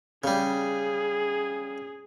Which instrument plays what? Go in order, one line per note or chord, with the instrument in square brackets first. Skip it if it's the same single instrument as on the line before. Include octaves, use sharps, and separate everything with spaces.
[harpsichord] C#3 G3 [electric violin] G#4